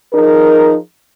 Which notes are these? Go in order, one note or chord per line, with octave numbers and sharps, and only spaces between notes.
F3 D#4 G#4 A#4